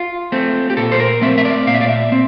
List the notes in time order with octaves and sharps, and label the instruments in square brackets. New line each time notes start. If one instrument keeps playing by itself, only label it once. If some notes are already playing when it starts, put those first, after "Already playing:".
Already playing: [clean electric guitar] F4
A3 C4
G4
A#2 A4
C5
A#4
A3 C4 E5
E5
D5
A#2 F5
E5
D5
E5
C4